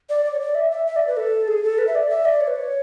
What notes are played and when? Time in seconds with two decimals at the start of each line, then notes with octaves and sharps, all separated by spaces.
0.09 D5
0.25 D5
0.33 C#5
0.41 D5
0.55 E5
0.71 E5
0.87 E5
0.96 D5
1.07 B4
1.17 A4
1.48 G#4
1.64 A4
1.78 B4
1.87 E5
1.95 D5
2.10 E5
2.25 D5
2.41 C#5
2.47 B4
2.56 C#5